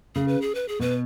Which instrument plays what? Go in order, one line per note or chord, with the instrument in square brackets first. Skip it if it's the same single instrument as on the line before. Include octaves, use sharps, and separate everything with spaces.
[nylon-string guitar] C#3 [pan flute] G#4
[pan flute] B4
G#4
B4
G#4
[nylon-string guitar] B2 [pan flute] B4